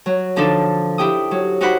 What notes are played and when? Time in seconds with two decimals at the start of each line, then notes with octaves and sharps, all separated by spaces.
0.06 F#3
0.36 D3 F3 D4 D#4 A4
0.98 E4 G4 G5 D#6
1.31 F#3
1.61 D#4 F#4 G4 C5 F#5 B5